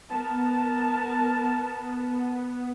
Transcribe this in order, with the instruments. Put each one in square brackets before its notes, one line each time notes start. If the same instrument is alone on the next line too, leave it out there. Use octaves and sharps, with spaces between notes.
[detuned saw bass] B3 [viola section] A#4 A5